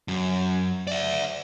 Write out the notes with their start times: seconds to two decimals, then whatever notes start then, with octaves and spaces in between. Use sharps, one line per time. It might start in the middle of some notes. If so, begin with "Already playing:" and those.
0.08 F#2
0.87 D5 E5